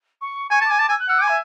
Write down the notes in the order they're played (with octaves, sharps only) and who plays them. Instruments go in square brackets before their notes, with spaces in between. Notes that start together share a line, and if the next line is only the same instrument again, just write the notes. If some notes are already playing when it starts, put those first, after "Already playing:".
[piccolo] C#6
[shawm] G#5 [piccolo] C#6
[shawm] A5 [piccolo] D6
[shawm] G#5
[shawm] A5 [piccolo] D6
[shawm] G#5 [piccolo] E6
[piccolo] F#6
[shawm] F#5 [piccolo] E6
[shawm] G#5 [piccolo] D6
[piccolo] E5